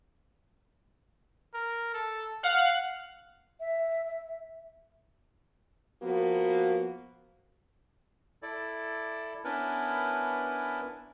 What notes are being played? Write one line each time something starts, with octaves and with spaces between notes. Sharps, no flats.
A#4
A4
F5 F#5
E5
F3 A#3 B3 F#4
E4 A4 D5
B3 C#4 D4 E4 A#4 B4